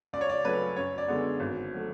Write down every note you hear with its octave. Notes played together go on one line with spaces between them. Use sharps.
C#2 D5
C#5
D5
C#3 F#3 A3 C#4 B4
F#2 C#5
D5
D3 G#3 B3
G#1
F#3 A3